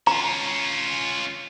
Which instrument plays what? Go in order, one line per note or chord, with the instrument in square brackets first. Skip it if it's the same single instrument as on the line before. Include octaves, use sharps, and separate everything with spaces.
[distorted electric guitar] C#4 F4 [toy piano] A#5